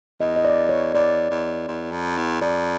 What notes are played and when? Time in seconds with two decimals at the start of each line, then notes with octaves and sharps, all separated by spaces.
0.20 E2 D#5
0.36 D#5
0.45 D5
0.69 C#5
0.94 E2 D5
1.30 E2
1.68 E2
1.92 F2
2.17 E2
2.41 F2 D5